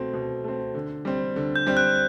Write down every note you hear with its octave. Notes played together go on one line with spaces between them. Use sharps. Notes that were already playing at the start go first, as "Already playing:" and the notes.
Already playing: B2 A3 C4
B2
A3 C4
D3
G3 C4
D3
G6
G3 C4
F#6